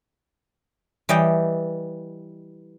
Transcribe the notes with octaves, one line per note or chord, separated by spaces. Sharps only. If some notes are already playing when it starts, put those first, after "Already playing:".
E3 G3 D#5 G5